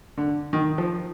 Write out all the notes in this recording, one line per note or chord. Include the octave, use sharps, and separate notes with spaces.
D3
D#3
F3